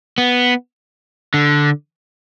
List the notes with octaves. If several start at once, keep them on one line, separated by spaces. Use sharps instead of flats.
B3
D3